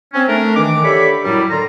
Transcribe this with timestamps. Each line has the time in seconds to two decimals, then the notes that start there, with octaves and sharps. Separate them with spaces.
0.14 C4 C#4
0.28 A3 D4 A#4
0.56 D#3 E3 D6
0.84 D3 G4 A4 C#5 E5 B5
1.24 F#2 A2 F#3 G3
1.51 D3 F4 A#5